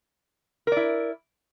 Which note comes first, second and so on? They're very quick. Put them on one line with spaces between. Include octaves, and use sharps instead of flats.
A#4 D5 E4